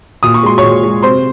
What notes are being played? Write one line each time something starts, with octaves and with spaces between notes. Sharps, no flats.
A#2 D#6
C#6
G#3 C6
C#5 C#6
A#2
G#3
C3 C5 C6